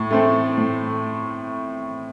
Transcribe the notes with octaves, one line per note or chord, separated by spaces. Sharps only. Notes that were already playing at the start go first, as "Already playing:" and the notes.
Already playing: A2
A3 C4 A4
A2